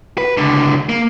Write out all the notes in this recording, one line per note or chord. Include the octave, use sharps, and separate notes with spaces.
B4
C#2 D3
A#3